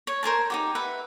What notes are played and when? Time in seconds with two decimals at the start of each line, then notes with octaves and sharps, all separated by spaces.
0.07 C#5
0.23 A#4 C5 G#5 A5
0.50 D#4 F#4 G4
0.75 B4 E5 F#5